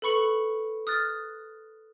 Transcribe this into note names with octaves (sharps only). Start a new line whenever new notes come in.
A4 B4 B5 C#6 C#7 F#7
D#6 F6 F#6 A6